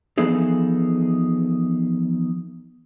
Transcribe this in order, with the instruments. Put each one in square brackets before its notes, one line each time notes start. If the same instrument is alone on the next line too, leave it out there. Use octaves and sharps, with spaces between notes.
[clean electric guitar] E3 F3 B3 D#4 G#4 A4